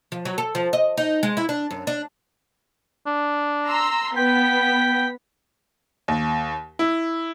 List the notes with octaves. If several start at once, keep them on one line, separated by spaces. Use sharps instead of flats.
F3
F#3
A4
F3
D#5
D#4
G#3
E4
D4
F#2
D4
D4
A#5 C6 E6
B3 G5 B6
D#2
E4